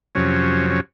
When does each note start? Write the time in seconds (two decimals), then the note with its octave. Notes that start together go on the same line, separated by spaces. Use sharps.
0.15 F2 C3 F#3 C#4
0.70 C#4